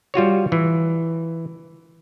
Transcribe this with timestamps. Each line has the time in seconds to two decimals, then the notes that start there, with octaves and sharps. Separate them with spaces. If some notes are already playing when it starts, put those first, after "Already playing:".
0.14 G3 F4 F#4 C#5
0.52 E3